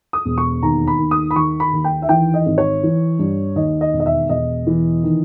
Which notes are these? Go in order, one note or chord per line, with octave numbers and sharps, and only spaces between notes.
D#6
E1
C#6
D#2 A#5
B5
D#2
D#6
B5
D#3 C#6
B5
D#2
G5
E5
E3 G5
D#5
G#1
C#5
E3
G2
D#2 D#5
D#5
E1
D#5
E5
E1 D#5
E3
D#3